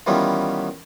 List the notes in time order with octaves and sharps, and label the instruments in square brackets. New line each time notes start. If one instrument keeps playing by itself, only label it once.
[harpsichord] D#3 E3 G3 B3 C#4 F4